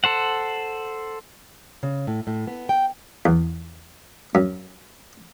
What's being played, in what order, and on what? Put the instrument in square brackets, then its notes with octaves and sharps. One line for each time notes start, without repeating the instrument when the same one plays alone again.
[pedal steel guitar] A4 C5 F#5
[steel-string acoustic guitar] C#3
A2
A2
B3
G5
[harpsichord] E2
F#2